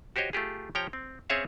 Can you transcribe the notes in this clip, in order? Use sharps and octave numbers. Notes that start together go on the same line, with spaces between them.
F#4 G4 C5 C#5 D#5
A3 F4 G4 G#4
F3 G4 C#5 G5 A#5
C4
C4 C#4 G#4 C#5 E5 F5